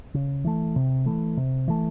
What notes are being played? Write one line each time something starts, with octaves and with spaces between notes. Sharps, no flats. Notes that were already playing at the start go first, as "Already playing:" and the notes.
C#3
E3 A3
C3
E3 A3
C3
E3 A3